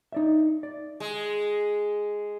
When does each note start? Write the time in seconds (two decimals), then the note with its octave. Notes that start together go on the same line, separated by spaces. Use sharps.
0.12 D#4 D5 E5
0.63 D5
1.00 G#3